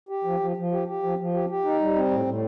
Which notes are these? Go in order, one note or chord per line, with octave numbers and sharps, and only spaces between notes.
G4
F3
F3
F3
G4
G4
F3
F3
G4
G4
D#4
G3
C4
A2
A2